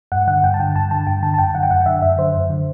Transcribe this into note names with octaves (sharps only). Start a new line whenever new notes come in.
G2 F#5
D3 F#5
G2 G5
A5
D3 G5
G2 A5
D3 A5
G2 G5
D3 A5
A5
F#2 G5
D3 F#5
G5
F#2 F#5
D3 E5
F#2 E5
D3 C5
F#2
D3